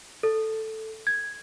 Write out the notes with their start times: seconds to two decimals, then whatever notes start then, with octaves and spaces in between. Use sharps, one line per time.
0.23 A4
1.07 G#6